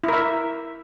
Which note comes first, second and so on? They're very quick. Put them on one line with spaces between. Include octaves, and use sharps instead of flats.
E4 A#4 E5